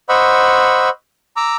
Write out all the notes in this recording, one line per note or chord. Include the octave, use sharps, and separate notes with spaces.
C5 D#5 F#5 B5 C#6 E6
A#5 D6 E6